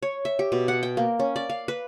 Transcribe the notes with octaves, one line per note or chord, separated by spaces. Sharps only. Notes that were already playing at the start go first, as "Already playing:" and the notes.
C#5
E5
G4
B2
F#5
G5
A#3
C#4
D5
F5
B4